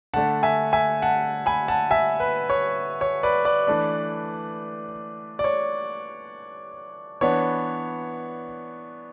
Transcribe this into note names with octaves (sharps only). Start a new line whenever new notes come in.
D3 A3 D4 F#5 A5
E5 G#5
E5 G#5
F#5 A5
G#5 B5
F#5 A5
E5 G#5
B4
C#5
C#5
B4 D5
B4 D5
E3 A3 D4
D5
C#5
E3 B3 D4 C#5